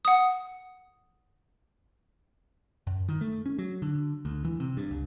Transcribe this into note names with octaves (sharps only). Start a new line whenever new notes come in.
F#5 D#6
F#2
D#3
A3
C#4
F#3
D3
D2
E3
C3
G2
C#2